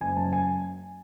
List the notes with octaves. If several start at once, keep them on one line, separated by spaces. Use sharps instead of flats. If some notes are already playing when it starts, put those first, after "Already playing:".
F#1 G#5
F#2 A5
G#5